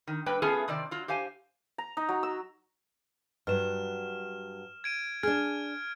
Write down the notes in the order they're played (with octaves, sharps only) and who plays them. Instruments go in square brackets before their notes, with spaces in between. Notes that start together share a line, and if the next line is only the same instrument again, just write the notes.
[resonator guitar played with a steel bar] D#3
G2 A#3 B4 G5
A3 B3 C#4 F4 G#4 A4
C3 D#3 C4 D5
F#3 F4
G4 C5 F5 G#5
[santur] A#5
D#4
F#3
E6
[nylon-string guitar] G2 F#3 [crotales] F6 E7
[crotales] G#6 D7 D#7
[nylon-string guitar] D4 G#4 [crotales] F6 G#6 D7